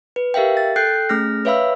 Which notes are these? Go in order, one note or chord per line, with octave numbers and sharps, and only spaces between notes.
B4
G4 A#4 E5 F5 G5
A6
A4 G5 F#6 G6 C7
A3 C#4 G#4 F6 A#6
B4 C#5 E5 F5 B5 E6